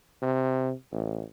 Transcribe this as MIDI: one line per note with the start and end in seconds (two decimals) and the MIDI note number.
0.22 0.72 48
0.92 1.23 33